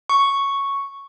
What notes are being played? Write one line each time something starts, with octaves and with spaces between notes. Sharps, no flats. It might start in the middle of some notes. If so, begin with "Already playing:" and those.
C#6